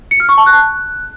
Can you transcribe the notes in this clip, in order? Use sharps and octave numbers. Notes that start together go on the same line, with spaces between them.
C#7
F6
C#6
A5
F#6